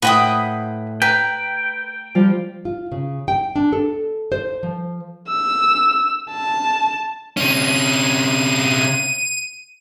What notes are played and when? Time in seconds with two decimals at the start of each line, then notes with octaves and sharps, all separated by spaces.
0.02 A2 B4 F#5 G5 C6 D#6
1.02 B4 G5 A#5
2.15 F3 G3 F4
2.65 F4
2.92 C#3
3.28 G5
3.56 D4
3.73 A4
4.32 C5
4.63 F3
5.29 E6
6.31 A5
7.37 C3 C#4 D#7